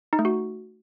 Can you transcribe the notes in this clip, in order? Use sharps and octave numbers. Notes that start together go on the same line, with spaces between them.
D#4
A3
F#4